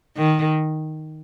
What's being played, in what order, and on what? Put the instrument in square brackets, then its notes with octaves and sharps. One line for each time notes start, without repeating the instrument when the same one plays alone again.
[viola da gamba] D#3